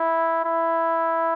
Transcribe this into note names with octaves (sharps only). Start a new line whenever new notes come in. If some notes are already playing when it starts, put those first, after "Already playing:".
Already playing: E4
E4